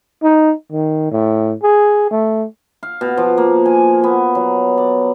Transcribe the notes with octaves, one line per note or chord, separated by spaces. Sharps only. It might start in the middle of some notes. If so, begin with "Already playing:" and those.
D#4
D#3
A2
G#4
A3
F5
B2
F3
A#3
G#5
B3
F#3
D5